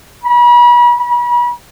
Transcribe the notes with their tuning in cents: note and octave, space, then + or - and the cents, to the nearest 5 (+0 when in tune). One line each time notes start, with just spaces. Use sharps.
B5 -40
B5 -40